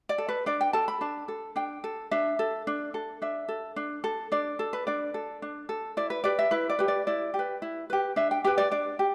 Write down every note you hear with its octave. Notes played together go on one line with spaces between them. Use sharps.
D5
A4
B4
D4 D5
G5
A4 A5
B5
D4 A5
A4
D4 G5
A4
D4 E5
A4
D4
A4
D4 E5
A4
D4
A4
D4 D5
A4
B4
D4 D5
A4
D4
A4
E4 D5
B4
G4 B4 D5
E5
E4 B4
D5
G4 B4
D5
E4 D5
G4
B4
E4
G4 B4
D4 E5
G5
G4 B4 G5
D5
D4 D5
G4